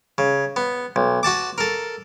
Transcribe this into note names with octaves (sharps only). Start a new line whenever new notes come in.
C#3
B3
B1
F#4 F#5 A5 D6
A4 A#4